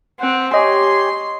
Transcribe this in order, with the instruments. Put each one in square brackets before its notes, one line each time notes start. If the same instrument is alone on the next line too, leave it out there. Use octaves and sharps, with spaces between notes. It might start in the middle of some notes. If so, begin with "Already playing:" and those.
[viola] C4 [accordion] F#5
[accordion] G4 C#5 G#5 [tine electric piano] D#5 [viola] C6